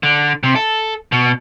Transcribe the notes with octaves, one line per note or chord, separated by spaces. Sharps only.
D3
C3
A4
B2